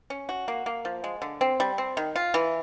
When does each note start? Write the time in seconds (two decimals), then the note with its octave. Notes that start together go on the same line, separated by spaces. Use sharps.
0.10 C#4
0.29 F#4
0.48 A#3
0.66 A#3
0.85 F3
1.04 G#3
1.22 D3
1.41 C4
1.60 G3
1.78 C4
1.97 D#3
2.16 F4
2.34 E3